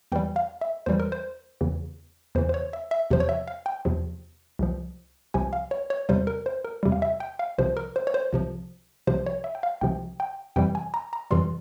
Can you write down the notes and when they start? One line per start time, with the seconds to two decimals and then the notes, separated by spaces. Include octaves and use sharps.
0.12 E2 E3 G3 G5
0.36 F5
0.61 E5
0.86 E2 E3 G3 C5
1.00 A#4
1.12 C5
1.61 E2 C#3 E3
2.35 E2 C#3 E3 C5
2.49 C5
2.54 C#5
2.73 E5
2.91 E5
3.11 E2 C3 F3 C5
3.20 C#5
3.29 E5
3.48 F5
3.66 G5
3.85 E2 C3 F3
4.59 C2 C3 F3
5.34 C2 C3 F3 G#5
5.53 F5
5.71 C#5
5.90 C#5
6.09 E2 C3 G3 C5
6.27 A#4
6.46 C5
6.65 A#4
6.83 E2 C3 G3
6.92 F5
7.02 E5
7.20 G5
7.39 F5
7.58 C2 C3 F3 C5
7.77 A#4
7.96 C5
8.07 C#5
8.14 C5
8.33 C2 C3 F3
9.07 C2 C3 F3 C5
9.26 C#5
9.44 E5
9.55 G5
9.63 F5
9.81 C2 C3 F3 G5
10.20 G5
10.56 F2 C3 E3 G3 G5
10.75 G#5
10.94 A#5
11.13 A#5
11.31 F2 C3 E3 G3 C6